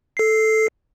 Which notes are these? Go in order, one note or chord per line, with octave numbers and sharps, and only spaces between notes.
A4 C7